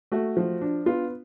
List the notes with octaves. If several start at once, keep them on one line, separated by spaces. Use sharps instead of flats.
A3 F#4
F3
D4
B3 F4